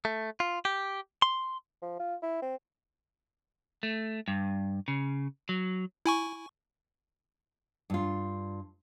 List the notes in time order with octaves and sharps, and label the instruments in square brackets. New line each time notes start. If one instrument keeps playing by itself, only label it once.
[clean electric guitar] A3
F4
G4
C6
[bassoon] F3
F4
E4
C4
[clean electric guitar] A3
G2
C#3
F#3
[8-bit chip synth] E4 G#5 C#6
[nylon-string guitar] G2 F4